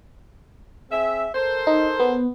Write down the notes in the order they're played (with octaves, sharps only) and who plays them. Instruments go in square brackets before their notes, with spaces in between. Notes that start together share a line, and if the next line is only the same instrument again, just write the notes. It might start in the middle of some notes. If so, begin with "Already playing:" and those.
[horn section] C4 G#4 E5
A4 A#4 C5
[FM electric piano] D#4
B3